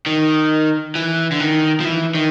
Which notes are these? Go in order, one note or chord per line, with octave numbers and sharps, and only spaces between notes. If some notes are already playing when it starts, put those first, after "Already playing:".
D#3
E3
D3
D#3
F3
E3
D#3